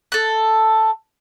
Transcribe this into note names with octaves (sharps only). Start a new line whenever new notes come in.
A4 F#6